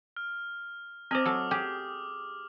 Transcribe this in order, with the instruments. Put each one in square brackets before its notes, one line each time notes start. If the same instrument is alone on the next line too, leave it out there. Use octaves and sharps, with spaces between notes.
[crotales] F6
[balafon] C4 C5 [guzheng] D#5 G#5 [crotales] D6 D#6 F6
[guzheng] F#3 A4
G4 G#4